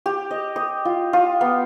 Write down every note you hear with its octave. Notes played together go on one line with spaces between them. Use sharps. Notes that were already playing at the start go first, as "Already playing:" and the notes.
G4
D#5
D#6
F4
F4
B3